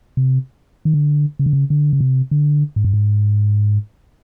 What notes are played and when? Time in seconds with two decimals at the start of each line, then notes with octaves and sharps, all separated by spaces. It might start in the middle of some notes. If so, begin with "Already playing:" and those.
0.17 C3
0.85 D#3
0.94 D3
1.39 C#3
1.46 D3
1.53 C#3
1.70 D3
1.93 C#3
2.01 C3
2.31 D3
2.76 G#2
2.85 G2
2.94 G#2